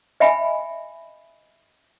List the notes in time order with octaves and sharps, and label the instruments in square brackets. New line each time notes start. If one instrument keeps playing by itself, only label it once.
[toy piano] D#5 E5 G5 G#5 B5